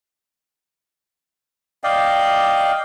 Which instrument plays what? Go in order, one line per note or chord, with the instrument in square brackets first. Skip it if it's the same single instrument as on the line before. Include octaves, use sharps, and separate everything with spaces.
[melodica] D5 D#5 F5 G5